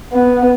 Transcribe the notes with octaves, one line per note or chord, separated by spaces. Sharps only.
B3